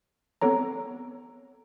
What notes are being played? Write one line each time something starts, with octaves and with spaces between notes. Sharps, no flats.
B3 C4 A4 C#5 A#5